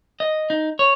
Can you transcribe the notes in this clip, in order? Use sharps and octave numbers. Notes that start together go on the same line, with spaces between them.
D#5
D#4
C#5